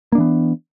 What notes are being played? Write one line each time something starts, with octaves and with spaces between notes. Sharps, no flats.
E3 A#3 B3 D4